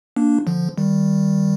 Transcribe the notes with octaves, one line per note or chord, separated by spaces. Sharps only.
A#3 D4
D3 F3
D#3 G3